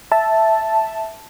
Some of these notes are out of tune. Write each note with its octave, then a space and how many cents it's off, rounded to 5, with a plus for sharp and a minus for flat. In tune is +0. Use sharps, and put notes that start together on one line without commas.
E5 +0 A5 +0